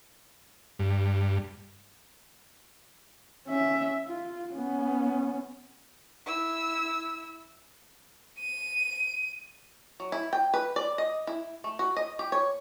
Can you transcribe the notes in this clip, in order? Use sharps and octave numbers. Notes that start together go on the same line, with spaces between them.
G2
C#4 E5
F4
B3 C#4
E4 E6
D#7
F#3
E4
G5
B4
D5
D#5
E4
A3
F#4
D#5
G4
C#5